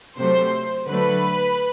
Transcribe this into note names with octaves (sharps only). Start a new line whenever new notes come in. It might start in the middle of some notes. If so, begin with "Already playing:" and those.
C3 F#3 A3 C5
D3 F#3 A3 B4